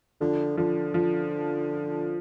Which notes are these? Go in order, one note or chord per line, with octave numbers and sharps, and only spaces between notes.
D3 F3
D3 F3
F3